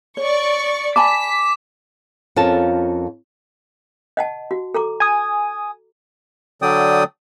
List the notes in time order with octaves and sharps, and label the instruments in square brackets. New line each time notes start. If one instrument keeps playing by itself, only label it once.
[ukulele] C#5 [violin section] D5 C#6
[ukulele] G#5 A5 B5 [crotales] D6 [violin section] B6
[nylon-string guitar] F2 C#4 F4 A4 A#4 A5
[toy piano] D#5 F#5 A5
F#4
A4 A#5 D6
[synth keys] G#5 D#6
[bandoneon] D3 F#3 D5 G5 D#6